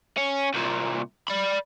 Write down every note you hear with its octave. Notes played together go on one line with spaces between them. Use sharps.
C#4
C2 A#2
D5 B5